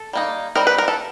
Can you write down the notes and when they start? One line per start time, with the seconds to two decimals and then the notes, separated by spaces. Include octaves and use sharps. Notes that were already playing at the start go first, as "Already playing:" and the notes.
Already playing: A4
0.13 G3 A#3 D#4
0.55 G3 C4 D#4 A#4
0.67 B4
0.78 A#4
0.88 A4